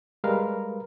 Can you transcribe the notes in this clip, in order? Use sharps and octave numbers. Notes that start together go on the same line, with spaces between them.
G3 G#3 A#4 B4 F5